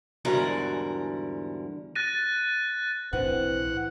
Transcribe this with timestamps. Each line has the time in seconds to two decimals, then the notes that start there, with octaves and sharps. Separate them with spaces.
0.25 E2 G#2 D3 G3 F#4 A#4
1.95 F#6 A6 A#6 D#7
3.13 B1 A2 E3 C4 D4 F#5